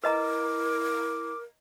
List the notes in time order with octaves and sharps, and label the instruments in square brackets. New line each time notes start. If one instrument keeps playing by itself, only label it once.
[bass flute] E4 [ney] A#4 [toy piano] B4 D#5 A#5 [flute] D6